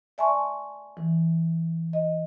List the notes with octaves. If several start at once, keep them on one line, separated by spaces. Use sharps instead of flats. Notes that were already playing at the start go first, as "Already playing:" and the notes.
D5 E5 G#5 A5 C6 C#6
E3
D#5